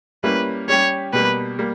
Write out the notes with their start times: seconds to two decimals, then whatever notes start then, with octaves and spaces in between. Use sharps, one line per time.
0.24 G3 A#3 C#4 E4 B4
0.69 G3 C#4 G4 C#5
1.13 B2 G3 A#3 B4
1.59 G3 A#3